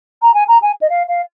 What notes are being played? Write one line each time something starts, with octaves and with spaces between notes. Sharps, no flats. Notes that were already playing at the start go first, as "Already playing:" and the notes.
A#5
G#5
A#5
G#5
D#5
F5
F5